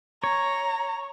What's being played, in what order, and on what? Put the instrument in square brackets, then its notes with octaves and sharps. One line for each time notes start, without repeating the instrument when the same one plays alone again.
[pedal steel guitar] C#5 [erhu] A#5